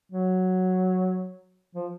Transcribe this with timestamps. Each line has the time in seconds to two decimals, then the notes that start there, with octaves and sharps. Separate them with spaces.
0.12 F#3
1.75 F3